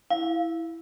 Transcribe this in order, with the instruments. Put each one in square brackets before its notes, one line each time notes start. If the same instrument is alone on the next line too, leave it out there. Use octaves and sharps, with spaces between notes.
[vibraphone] E4 [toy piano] F5